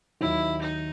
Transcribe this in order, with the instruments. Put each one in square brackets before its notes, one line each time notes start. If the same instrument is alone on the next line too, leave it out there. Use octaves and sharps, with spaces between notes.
[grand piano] D#2 D#3 F#3 [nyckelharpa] E4
[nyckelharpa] D#4